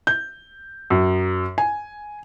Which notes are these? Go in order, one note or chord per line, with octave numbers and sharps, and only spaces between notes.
G6
F#2
G#5